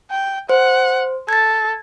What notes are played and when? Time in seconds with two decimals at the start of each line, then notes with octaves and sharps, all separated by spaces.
0.11 G5
0.49 C5 F#5
1.29 A4 G#6 A6